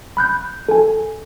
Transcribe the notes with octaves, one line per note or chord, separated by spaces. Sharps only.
B5 F#6 G6
A4 G#5